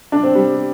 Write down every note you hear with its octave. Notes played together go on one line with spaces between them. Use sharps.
D4
C4
G3